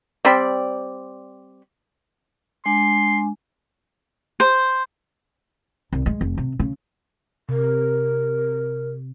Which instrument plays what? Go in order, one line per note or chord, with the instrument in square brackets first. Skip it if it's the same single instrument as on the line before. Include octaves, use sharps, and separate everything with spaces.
[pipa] G3 C4 D5 B5
[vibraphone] G#3 D4 G#5 [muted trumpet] C6
[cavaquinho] C5
[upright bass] C2
G#3
F1
C3
C#3
[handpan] C3 [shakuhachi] A#4